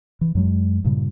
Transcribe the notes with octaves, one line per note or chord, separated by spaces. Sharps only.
E3
F#2 F#3 G#3
G2 A#2 C#3